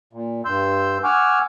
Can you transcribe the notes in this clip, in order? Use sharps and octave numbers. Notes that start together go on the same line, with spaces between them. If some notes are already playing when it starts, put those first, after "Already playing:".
A#2
G2 C6 E6 G6
F#5 G#5 C#6 D6 E6 F6